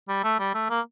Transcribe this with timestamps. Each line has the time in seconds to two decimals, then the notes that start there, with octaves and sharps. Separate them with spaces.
0.08 G3
0.24 A3
0.39 G3
0.54 A3
0.70 A#3